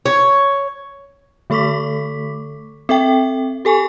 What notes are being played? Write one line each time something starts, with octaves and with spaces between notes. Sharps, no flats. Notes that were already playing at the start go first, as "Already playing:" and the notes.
C#5
D3 A3 A4 C#6 D6 B6
C4 A4 E5 G5
G4 A4 G#5 C#6